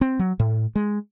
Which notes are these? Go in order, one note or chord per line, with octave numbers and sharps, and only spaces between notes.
C4
F#3
A2
G#3